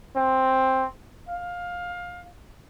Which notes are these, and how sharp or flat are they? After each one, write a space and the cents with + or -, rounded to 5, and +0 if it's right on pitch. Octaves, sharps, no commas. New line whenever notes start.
C4 +5
F5 +20